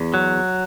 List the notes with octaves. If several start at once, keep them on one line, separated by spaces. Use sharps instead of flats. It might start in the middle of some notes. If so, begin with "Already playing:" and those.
Already playing: E2
F#3